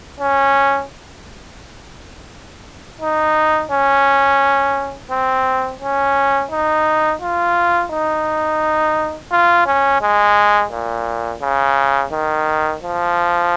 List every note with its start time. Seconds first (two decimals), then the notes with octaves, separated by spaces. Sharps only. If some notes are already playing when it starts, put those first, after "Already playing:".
0.20 C#4
3.01 D#4
3.71 C#4
5.11 C4
5.81 C#4
6.51 D#4
7.21 F4
7.92 D#4
9.32 F4
9.67 C#4
10.02 G#3
10.72 A#2
11.42 C#3
12.12 D#3
12.82 F3